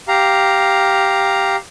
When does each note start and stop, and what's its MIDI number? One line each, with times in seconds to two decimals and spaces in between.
0.08 1.56 67
0.08 1.56 77
0.08 1.56 82